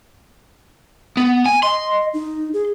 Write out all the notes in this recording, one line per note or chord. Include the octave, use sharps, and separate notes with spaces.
B3
G#5
D#5 C6
D#4
G#4